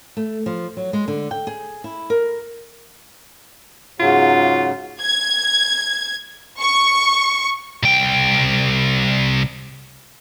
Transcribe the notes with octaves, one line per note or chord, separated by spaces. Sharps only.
A3
F3
F#3
G#3
D3
G5
G#4
E4
A#4
G#2 C#3 F#3 F4
G#6
C#6
C2 G5